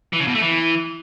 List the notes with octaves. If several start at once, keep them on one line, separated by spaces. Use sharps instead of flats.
E3
C#3
B2
A3
E3